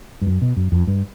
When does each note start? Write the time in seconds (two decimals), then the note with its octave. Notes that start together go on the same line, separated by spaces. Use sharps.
0.22 G2
0.27 F#2
0.42 B2
0.57 F#2
0.72 F2
0.87 G2